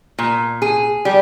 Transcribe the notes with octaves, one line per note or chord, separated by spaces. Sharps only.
A#2
G#4
G3